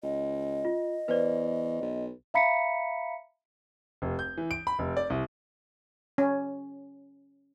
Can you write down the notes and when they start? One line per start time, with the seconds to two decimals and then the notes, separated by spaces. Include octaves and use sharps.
0.03 C#2 D#5
0.65 F4
1.08 E2 B4 C5 D5
1.81 B1
2.34 E5 F5 A#5 B5 B6 C#7
4.02 F1
4.19 G6
4.37 E3
4.51 D7
4.67 B5
4.79 F1
4.97 D5
5.10 C2
6.18 C#4